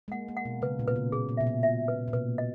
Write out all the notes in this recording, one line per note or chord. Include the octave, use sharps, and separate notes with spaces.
G#3
A#3 F#5
A#3
F#5
B2
C#3 B4
A#2
B2 B4
C#3
A#2 G#4
A#2
B2 E5
A#2
E5
B4
A#2
B2 B4
D#5